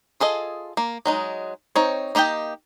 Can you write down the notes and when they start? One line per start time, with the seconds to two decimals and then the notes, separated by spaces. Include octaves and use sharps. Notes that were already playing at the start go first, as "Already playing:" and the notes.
0.20 F4 G#4 A4 D#5
0.77 A#3
1.06 F#3 G#3 D#4
1.76 C4 D#4 C#5
2.15 A#3 D#4 G4 D#5 G5